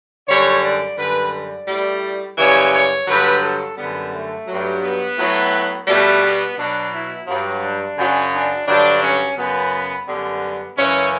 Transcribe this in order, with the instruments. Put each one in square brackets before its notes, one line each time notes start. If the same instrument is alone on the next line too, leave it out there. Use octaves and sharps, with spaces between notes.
[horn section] F#2 D3 G3 C#5
D5
F#2 D3 G3 B4
D5
A2 G3
F#2 C#3 E3 G3 C#5
C#5
G2 D3 F#3 B4
A4
F#2 D3 G3 B3
A3
G2 F#3
B3
A2 F#3
B2 G3 A3
B3
B2 F#3 D4
E4
G2 F#3
D4
F#2 C#3 F#3
D4
G2 D3 F#3 D4
C#4
F#2 C#3 F#3 B3
F#2 D3 G3 B3
F#2 C#3 E3 C#4